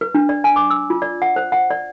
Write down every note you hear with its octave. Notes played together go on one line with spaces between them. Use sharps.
B4
D4
D5
G#5
D6
E6
F4
D5
F#5
C5
F#5
D5